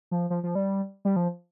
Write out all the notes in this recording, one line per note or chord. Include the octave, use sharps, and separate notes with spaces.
F3
F3
F3
G3
G3
F3